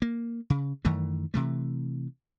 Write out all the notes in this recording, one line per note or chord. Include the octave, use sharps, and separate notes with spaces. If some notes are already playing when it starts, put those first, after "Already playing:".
A#3
C#3
F#2 D#3 E3 A3
C3 E3 A3